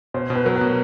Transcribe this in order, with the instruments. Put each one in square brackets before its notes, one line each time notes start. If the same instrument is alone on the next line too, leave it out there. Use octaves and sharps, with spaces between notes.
[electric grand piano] B2 [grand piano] C5
[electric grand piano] B2
[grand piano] B4
[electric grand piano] F#3 [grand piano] A#4
[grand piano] B4
[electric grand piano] B2